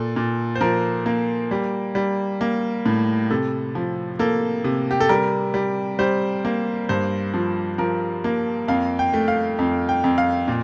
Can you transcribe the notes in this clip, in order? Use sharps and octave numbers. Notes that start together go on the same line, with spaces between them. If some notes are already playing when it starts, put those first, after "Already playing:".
Already playing: A#2 A4
A#2
C5
F3 A#4
A#3
G3
G3
A#3
A2
C3 A4
F3
A#3 A4
C3
G4
A4
G3 A#4
G3
G3 C5
A#3
G2 C5
F3
F3 A#4
A#3
F2 F5
G5
A3
F5
F2
G5
F2
F5
A#2